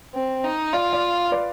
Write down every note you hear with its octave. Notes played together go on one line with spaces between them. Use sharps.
C4
D#4
F4 D5 F5
D5 F5
B4 D5